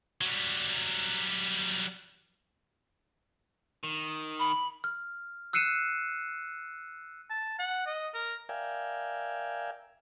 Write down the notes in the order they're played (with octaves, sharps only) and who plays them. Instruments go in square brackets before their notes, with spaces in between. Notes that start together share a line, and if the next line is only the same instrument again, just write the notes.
[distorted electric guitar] F#3 G3
[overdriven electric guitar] D#3
[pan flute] B5
[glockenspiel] F6
E6 F#6 C7 C#7 D#7 E7
[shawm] A5
F#5
D#5
A#4
[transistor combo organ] A#4 D5 E5 F5 G5 G#5